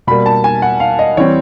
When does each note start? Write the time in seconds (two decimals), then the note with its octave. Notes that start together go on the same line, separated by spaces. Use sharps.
0.07 B2 G3 A#3 B5
0.26 A5
0.44 G#5
0.62 F#5
0.80 F5
0.99 D#5
1.17 E3 G3 C4 C#5